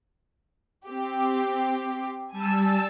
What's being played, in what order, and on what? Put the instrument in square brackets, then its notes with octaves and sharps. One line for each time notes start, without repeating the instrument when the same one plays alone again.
[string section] C4 G4
[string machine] G3 A5 E6 [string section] G#5